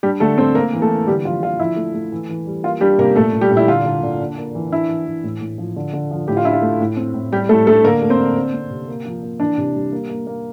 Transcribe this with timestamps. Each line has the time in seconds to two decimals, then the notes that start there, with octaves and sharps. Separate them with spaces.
0.03 G3 D4 G4
0.20 D3 A3 A4
0.38 A3 C4 C5
0.55 A#3 A#4
0.73 E3
0.82 A3 A4
0.90 E3
1.07 D3 G3 G4
1.24 F3 F4
1.42 D3 F4
1.60 F3 E4
1.76 A3
1.94 A3
2.12 E3
2.29 E3
2.47 G3
2.64 A#3 F4
2.81 G3 D4 G4
2.99 C3 A#3 A#4
3.16 A#2 A3 A4
3.33 A#2
3.41 G3 G4
3.51 A#2
3.57 E4
3.67 D3 F4
3.86 D3
4.03 D3
4.20 D4
4.38 A#3
4.55 E3
4.72 D4 E4
4.89 E3
5.06 E3
5.24 A2
5.41 A2
5.58 F3
5.76 D3
5.93 D3
6.11 F3
6.28 A2 G4
6.37 F4
6.45 D4 E4
6.53 F4
6.62 A3
6.81 A2
6.97 C4
7.14 A2
7.32 G3 G4
7.49 A2 A3 A4
7.67 A3 D4 A4
7.84 D3 A#3 A#4
8.02 A3
8.10 C4 C5
8.19 D3
8.37 C4
8.54 C4
8.70 C3
8.88 A#3
9.05 F3
9.23 A#3
9.40 E3 D4 D5
9.58 C3
9.75 G3
9.92 A#3
10.10 A#3
10.27 A#3